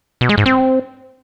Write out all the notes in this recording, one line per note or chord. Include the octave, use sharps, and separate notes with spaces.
B2
G#3
G#2
C4